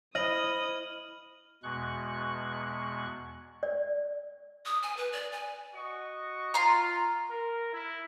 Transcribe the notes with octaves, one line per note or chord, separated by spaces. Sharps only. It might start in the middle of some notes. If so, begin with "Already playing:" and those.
E4 C5 D#5 B5 D#6 F6 F#7
E2 B2 G#3 C#6 F#6
D5
D#6
G#5
B4
D5
G#5
F#4 D#5 C#6
F4 A#5 C6
A#4
E4